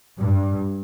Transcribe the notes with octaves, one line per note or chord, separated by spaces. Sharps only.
G2